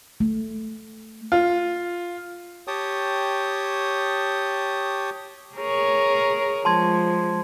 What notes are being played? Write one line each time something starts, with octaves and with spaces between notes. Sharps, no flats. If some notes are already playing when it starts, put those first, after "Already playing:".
A3
F4
G4 C#5 G5 A5 C#6 D#6
G#4 A#4 C#5
F3 G#3 A5 C6 G#6